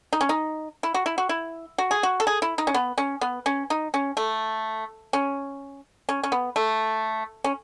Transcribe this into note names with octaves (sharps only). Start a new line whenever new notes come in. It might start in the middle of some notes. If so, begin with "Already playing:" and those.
D#4
C#4
D#4
E4
F#4
E4
F#4
E4
F#4
G#4
F#4
A4
G#4
E4
D#4
C#4
B3
C#4
B3
C#4
D#4
C#4
A3
C#4
C#4
C#4
B3
A3
C#4